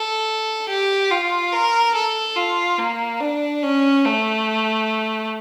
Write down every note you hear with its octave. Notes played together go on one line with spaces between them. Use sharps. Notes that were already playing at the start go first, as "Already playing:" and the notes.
Already playing: A4
G4
F4
A#4
A4
F4
A#3
D4
C#4
A3